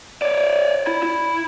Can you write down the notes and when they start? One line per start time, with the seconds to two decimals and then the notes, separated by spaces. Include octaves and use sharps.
0.22 C#5 D5
0.87 E4
1.03 E4